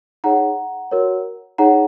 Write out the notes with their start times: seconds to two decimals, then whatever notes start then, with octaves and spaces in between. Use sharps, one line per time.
0.24 D#4 G#4 C#5 F#5 A#5
0.91 F#4 A#4 C#5
1.58 D#4 G#4 C#5 F#5 A#5